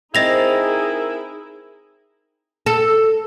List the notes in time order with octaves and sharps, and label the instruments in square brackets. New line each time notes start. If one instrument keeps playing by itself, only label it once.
[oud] C4 [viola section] D#4 G#4 A#4 [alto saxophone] E4 [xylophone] D#5 A#6 F7
[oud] A4